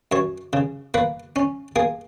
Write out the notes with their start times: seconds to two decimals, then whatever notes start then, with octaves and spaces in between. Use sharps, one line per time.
0.12 F#2 C#5
0.53 C#3
0.94 A#3 B4
1.36 C#4
1.76 A#3 G#4